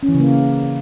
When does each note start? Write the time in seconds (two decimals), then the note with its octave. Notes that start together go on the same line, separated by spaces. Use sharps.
0.03 C#4
0.08 E3
0.14 C#3
0.20 A#3